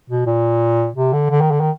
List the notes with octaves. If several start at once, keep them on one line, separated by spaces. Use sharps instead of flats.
B2
A#2
C3
D3
D3
D#3
D3
D#3